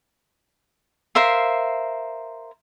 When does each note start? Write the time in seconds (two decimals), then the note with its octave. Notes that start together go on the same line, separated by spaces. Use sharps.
1.15 A#4 C5 E5 F5